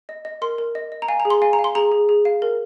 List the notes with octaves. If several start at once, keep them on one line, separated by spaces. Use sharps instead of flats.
D#5
D#5
A#4 C6
A#4
D#5
D#5
A#5
F5 G#5
A#5
G#4
C6
F5 G#5
A#5
F5
C6
G#4 A#5
G#4
G#4
F5
A#4